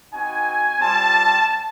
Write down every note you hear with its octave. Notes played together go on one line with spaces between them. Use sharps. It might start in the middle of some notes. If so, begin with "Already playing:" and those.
C4 D#4 F#4 G#5
G3 C4 F4 A5